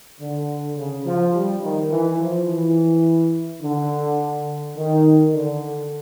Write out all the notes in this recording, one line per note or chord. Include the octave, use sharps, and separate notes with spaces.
D3
C#3
F3
G3
D#3
E3
F3
E3
D3
D#3
D3